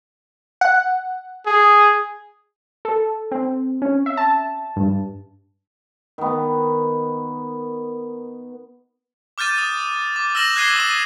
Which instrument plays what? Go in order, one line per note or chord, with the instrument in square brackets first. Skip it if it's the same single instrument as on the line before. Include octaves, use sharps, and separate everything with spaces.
[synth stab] F#5
[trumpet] G#4
[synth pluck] A4
C4
C#4
E5
A5
G2
[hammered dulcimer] D#3 B3
[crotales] D6 F6 G6 A6 D#7
D#6
D6
E6 F6 A#6 E7 F#7
F#6 G#6 C7 D#7 G7
D6 D#6 D#7